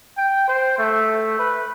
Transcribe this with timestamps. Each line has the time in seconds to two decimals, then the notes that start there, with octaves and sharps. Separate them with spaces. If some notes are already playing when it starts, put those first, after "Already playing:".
0.18 G5
0.48 C5
0.78 A3
1.39 B4